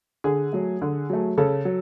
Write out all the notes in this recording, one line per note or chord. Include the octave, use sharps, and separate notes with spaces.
D3 G#4
F#3 A3
D3
F#3 A3
C#3 A4
F#3